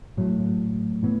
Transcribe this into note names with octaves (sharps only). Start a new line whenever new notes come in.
A2 F#3 A3
A2 E3 B3